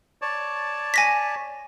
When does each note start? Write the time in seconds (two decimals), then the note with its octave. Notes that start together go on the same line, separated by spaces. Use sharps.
0.22 C#5 D5 A5
0.94 G#5 A#6 B6